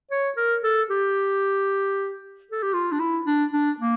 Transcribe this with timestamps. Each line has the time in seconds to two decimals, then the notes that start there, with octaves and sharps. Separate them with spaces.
0.11 C#5
0.37 A#4
0.63 A4
0.90 G4
2.51 A4
2.62 G4
2.73 F4
2.92 D4
3.00 E4
3.26 D4
3.53 D4
3.80 A#3